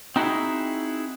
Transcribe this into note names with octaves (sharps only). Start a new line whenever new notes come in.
C4 D#4 E4 F#4 G#4